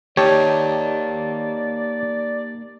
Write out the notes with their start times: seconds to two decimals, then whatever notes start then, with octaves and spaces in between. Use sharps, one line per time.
0.17 A#3 D#4 G4 C#5 D5 A5